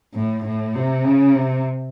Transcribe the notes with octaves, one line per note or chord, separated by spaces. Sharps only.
A2
A2
C3
C#3
C3